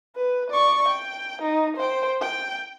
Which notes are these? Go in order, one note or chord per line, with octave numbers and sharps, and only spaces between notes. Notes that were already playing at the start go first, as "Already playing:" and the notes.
B4
D5 C#6
G5
D#4
C5 G5
G5